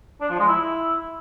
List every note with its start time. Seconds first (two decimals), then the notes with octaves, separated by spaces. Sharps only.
0.21 D4
0.30 F3
0.39 G#3
0.48 E4